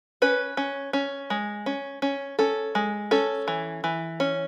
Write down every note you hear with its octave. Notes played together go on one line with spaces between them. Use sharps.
C#4 B4
C#4
C#4
G#3
C#4
C#4
C#4 A4
G#3
C#4 A4
E3
E3
C#4